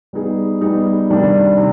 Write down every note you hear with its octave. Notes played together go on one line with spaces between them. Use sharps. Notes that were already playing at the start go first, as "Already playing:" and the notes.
G3 B3 D#4 G#4
G3 B3 D#4 G#4
C3 D#3 G3 D4
C3